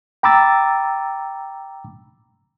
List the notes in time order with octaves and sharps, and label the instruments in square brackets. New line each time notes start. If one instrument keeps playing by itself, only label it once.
[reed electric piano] G5 A#5 B5 D6 E6 A6